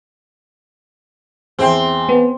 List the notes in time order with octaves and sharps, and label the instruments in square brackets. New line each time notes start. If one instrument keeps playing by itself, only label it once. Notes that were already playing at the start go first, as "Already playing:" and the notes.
[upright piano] E2 E5 [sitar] C4
[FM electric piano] B3